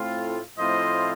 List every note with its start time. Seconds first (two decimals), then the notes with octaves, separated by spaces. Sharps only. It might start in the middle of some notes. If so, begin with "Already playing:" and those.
Already playing: A2 A3 C4 F4
0.56 A2 F3 A3 C4 F4 C5 D#5